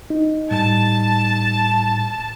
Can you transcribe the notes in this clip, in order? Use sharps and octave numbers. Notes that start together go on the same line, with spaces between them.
D#4
A2 G3 A5